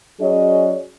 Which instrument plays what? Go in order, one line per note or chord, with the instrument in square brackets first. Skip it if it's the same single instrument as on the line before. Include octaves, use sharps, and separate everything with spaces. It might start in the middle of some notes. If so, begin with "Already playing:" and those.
[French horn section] F#3 C#4 G#4 D5 D#5